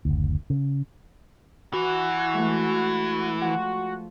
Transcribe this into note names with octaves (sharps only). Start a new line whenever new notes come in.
F#1 D2
C#3
E3 F#4
G#3 A3
F3 F#4